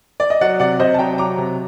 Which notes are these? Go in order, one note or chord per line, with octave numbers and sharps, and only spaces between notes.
D5
D#5
F#3 D5 F#5
C3 D5 F#5
C3 C5 D#5
A5
F#3 G5 A#5
F#3 A#5 D6
C3